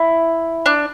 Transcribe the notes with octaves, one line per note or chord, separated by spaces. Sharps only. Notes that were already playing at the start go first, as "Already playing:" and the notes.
Already playing: E4
D4